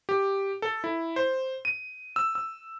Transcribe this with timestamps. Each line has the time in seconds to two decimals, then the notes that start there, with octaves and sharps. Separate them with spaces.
0.09 G4
0.62 A4
0.84 E4
1.16 C5
1.65 D#7
2.16 E6
2.35 E6